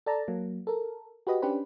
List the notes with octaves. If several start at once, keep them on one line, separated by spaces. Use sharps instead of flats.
A4 D5 A5 A#5
F#3 A#3
A4 A#4
F#4 G4 B4 D#5
C#4 D4 G4 B4 C5